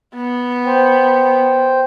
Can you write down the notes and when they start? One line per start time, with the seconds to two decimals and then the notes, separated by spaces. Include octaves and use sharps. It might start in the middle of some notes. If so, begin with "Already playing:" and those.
0.15 B3
0.66 C5 G5